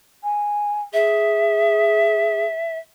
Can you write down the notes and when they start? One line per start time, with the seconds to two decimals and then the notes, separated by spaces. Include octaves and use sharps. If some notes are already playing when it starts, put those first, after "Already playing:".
0.24 G#5
0.93 G#4 E5